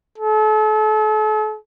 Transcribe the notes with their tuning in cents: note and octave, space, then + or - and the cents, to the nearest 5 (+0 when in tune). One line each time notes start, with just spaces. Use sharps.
A4 -40